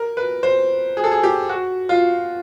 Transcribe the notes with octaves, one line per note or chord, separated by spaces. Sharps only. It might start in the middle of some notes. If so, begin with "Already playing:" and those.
Already playing: A#4
B4
C5
G#4
A4
G#4
G4
F#4
F4